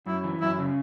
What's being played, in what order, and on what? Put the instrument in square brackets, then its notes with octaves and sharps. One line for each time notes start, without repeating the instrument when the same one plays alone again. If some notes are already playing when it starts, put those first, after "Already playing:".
[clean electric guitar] F#2 [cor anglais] E4
[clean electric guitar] E3
[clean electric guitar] F#2 [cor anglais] E4
[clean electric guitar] C#3